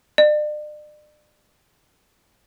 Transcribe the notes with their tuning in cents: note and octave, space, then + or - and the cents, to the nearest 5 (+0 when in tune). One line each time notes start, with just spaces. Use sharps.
D5 +40